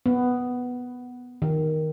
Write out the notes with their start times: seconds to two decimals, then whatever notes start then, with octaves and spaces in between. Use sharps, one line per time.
0.06 B3
1.42 D#3